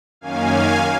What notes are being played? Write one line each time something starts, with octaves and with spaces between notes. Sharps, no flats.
F#2 D#3 A#3 C#4 F5 G#5